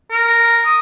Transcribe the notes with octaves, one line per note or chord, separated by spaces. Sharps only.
A#4
D#6